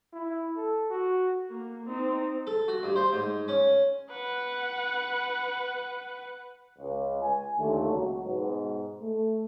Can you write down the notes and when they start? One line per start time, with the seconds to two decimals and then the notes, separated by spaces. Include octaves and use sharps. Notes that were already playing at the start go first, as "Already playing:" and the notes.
0.13 E4
0.56 A4
0.91 F#4
1.49 A#3
1.86 C4 D#4
2.47 A4
2.68 F#4
2.83 G2
2.96 C5
3.13 G#2
3.48 C#4
4.10 B4 F#5
6.77 C#2
7.21 G#5
7.57 D#2 A#2 D3 A3
7.89 C#2 F#3
8.23 G#2 B2
9.01 A3